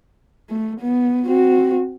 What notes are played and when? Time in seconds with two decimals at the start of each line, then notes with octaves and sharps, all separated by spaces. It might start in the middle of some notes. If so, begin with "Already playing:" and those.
0.50 A3
0.80 B3
1.27 C4 F#4